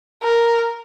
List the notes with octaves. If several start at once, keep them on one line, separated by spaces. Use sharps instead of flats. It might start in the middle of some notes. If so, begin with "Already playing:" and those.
A#4